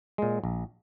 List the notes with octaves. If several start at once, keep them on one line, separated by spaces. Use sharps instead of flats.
A#2 G#3
A#1